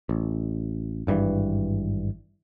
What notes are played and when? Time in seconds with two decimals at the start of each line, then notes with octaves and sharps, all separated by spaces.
0.09 A1
1.07 G#1 G2 C#3 E3